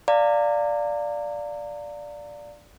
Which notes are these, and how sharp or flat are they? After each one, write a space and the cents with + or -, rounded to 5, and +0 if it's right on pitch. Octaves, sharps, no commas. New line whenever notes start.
D5 +0 F5 +0 A#5 -35